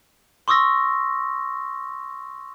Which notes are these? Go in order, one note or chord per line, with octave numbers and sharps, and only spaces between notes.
C6 C#6 D#6 E6 A#6